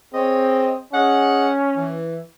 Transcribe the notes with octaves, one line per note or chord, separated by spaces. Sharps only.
C4 G#4 C#5 D#5
C#4 G#4 D#5 F#5
E3